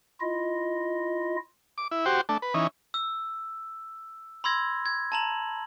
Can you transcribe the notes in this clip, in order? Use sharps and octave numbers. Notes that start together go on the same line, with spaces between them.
E4 F4 D#5
D6
E4
F#4 G4 C5
A3 D4
B4
E3 C#4 D#4
E6
B5 C6 E6 G#6 A#6
G#6
A5 A#5 F#7